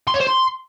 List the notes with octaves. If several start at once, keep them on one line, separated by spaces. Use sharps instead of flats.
C6
C#5
C5
C6